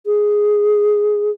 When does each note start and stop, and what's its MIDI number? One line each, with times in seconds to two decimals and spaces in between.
0.06 1.31 68